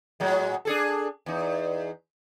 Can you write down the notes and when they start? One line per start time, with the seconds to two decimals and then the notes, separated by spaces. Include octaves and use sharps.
0.20 A2 F#3 G#3
0.65 D4 G#4 A4
1.26 E2 D#4